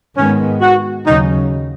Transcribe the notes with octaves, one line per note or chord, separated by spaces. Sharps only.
G#2 D#3 G#3 B3 C#4
F#4
D#2 C#3 F#3 C#4 D#4